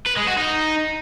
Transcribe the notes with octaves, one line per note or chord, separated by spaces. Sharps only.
B4
G#3
F#4
D#4